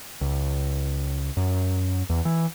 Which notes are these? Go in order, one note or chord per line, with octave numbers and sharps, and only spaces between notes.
C#2
F#2
E2
E3